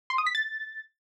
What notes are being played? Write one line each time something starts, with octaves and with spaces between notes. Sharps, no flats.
C6
D#6
B6
A6